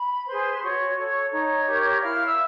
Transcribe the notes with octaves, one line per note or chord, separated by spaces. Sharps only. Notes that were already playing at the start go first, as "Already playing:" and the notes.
Already playing: B5
G#4 B4 C5 C6
F#4 C#5 C#6
A4 C#5
D#4 C#5 C#6
G4 A#4
E4 F5 F6
E5 E6